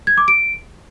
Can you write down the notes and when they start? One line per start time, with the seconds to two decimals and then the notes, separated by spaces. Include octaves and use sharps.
0.07 G#6
0.18 D6
0.28 D7